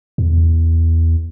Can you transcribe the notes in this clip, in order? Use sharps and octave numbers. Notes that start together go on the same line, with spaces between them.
E2